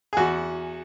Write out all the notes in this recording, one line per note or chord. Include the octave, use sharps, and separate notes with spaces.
G#4
E2 F#4